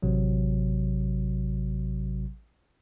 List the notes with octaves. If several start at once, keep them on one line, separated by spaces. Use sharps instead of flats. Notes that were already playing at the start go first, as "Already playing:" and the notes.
A1 C3 F#3